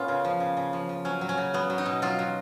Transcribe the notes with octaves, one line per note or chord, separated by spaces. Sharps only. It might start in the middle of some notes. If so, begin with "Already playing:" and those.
Already playing: A#2 B3 C#4 F4
C#3
F3
C#3
C#3
F3
F3
F#3 C#4
F#3
C#4
C#3
F#3 B3
F#3
D#4
B2
F#3 F4
F#3